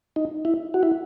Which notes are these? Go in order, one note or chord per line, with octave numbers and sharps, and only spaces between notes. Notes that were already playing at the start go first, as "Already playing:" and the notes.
D#4
E4
F#4
E4